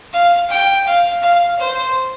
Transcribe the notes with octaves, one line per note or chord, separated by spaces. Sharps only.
F5
G5
F5
F5
C5